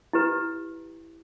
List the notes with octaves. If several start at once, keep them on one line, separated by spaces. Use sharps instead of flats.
E4 G4 B4